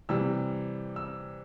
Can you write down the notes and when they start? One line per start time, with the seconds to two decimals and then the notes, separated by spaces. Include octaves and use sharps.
0.09 C3 E3 G3 E6
0.96 E6